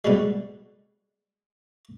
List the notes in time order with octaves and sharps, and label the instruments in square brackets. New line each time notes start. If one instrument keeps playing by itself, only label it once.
[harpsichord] B2 D3 G3 G#3